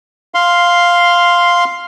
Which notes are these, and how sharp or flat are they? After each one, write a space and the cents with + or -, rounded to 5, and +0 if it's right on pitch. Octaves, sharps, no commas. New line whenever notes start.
F5 +0 C6 +0